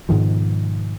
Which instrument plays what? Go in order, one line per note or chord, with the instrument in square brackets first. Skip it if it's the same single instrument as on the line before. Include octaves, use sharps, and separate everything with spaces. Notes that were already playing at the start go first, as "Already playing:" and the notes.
[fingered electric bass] G#2 B2 D#3 F3